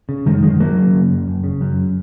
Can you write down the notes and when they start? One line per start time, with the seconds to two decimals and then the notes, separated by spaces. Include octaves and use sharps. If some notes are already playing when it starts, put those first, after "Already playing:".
0.09 C#3
0.26 F#2 D#3 G#3
0.43 F#1 D#3 G#3
0.60 F#1 F#3 A#3
0.76 C#3
0.94 F#2
1.10 F#1
1.28 F#1
1.44 C#3
1.61 F#2